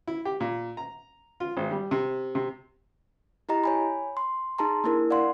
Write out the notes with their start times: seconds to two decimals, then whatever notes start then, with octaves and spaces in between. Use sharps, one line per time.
0.07 E4
0.25 G4
0.40 A#2
0.77 A#5
1.40 F4
1.57 G#1
1.71 G3
1.91 C3
2.35 C3
3.49 E4 G4 D#5 A#5
3.64 C#5 G#5 B5
4.17 C6
4.58 D#4 G#4 A5 A#5 C6
4.84 A#3 D4 E4 A#4
5.10 D5 F5 F#5 C6